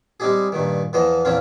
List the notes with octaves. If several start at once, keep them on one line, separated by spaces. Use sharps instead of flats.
G3 G#3 C4 D#4 G4 G#4
G2 A#2 D#3
E2 E3 F3 C5 D#5
E2 A#2 F3 C4 C#4 F4